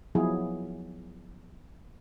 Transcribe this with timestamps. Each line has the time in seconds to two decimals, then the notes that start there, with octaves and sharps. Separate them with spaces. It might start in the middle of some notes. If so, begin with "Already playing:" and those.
0.15 F3 F#3 B3 E4 G#4